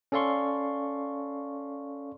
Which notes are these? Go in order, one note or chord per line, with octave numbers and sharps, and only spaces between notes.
C#4 A4 D5 F5 C6 C#6